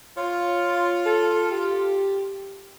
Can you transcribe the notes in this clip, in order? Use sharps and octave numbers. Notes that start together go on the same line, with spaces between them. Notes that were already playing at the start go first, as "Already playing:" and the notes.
F4 C#5
A4
G4